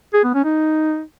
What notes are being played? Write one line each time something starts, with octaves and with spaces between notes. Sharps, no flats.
G#4
B3
C#4
D#4